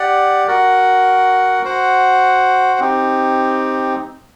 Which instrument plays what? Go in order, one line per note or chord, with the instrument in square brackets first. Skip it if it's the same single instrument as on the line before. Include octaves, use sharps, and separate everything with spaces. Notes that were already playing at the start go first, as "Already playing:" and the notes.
Already playing: [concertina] G4 D5 F#5
F#4 A#4 F#5
F#4 C5 F#5
C4 D#4 G4